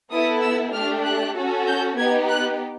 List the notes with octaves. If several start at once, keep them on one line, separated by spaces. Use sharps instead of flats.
B3 E4 A4 D#6
E6
A3 D4 G4 F6
F#6
C#4 F#4 A4
G6
B3 D#4 G4 G#6
F#6